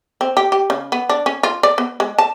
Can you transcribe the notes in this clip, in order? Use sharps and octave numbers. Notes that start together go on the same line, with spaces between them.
C4
G4
G4
C#3
B3
D4
C#4
F4
D5
B3
G#3
A5